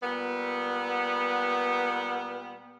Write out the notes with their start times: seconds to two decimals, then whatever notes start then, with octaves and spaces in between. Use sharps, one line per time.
0.03 A#2 G3 B3